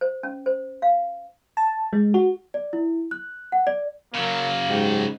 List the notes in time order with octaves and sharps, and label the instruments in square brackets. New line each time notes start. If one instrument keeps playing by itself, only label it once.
[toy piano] C5
C#4
C5
F5
[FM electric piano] A5
G#3
F#4
[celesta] D5
E4
F#6
F#5
D5
[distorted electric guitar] C#3 F#3 [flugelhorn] A#3 [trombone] A#4
[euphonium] G#2 [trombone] G4